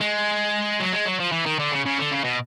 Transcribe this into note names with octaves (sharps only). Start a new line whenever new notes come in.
G#3
F#3
G#3
F#3
F3
E3
D#3
D3
C#3
C#3
D3
C#3
B2